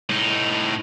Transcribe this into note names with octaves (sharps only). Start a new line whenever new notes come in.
A2 D#4